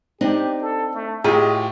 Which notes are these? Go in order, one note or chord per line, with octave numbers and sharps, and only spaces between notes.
C4 D4 D#4 G4
A4
A3
A2 F4 G4 G#4 D#5